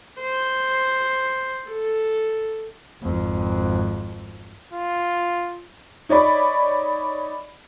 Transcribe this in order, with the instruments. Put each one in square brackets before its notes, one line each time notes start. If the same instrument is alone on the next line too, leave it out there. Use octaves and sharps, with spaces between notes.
[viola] C5
A4
[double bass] G#1 F2
[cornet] F4
[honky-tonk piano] D#4 C#5 D5 B5